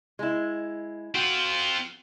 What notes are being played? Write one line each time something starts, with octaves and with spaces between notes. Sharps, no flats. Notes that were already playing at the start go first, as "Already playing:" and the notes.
G#3 E4
C4 F4 F#4